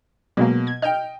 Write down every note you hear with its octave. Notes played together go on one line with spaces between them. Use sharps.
B2 F#3 G#3 A#3
G#6
D#5 G5 F6 G6 D7